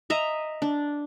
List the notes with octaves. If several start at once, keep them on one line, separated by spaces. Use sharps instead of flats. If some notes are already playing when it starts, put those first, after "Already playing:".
D#5 E5 A#5
D4